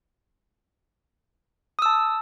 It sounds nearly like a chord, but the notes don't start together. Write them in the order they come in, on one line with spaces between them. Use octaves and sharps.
D#6 E6 A5